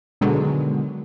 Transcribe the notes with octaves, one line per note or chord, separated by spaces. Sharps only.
B2 D3 D#3 F#3 G#3